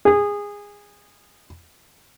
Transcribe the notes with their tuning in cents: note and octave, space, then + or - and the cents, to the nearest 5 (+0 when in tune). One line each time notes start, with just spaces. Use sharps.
G#4 -20